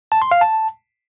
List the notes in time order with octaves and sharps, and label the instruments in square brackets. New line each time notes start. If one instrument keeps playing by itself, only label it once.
[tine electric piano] A5
C6
F5
A5